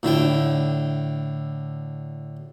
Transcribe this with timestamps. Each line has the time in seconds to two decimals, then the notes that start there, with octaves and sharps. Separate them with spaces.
0.03 A2 D3 E4 G5